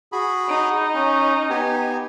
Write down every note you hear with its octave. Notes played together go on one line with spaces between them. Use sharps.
F#4 G#4 B5
D#4
C#4
B3 G4 G#5